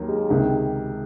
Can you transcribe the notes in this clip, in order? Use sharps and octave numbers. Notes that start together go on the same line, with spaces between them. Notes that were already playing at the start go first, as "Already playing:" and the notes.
Already playing: D#2 D#3 F#3 A#3
G#3
C#2 C3 D#3